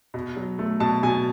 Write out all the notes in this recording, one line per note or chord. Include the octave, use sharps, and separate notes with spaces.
B2
F#3
A3
B2 A5
B2 G#5